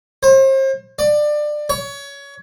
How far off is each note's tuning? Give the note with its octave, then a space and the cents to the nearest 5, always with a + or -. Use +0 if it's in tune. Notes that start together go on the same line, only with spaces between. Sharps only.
C5 +40
D5 +25
C#5 +20